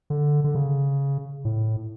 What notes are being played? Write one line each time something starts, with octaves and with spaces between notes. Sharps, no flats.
D3
D3
C#3
A2